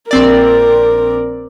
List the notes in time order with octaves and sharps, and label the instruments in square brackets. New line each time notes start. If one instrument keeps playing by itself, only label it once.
[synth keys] A#1 C4 D5 [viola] A#4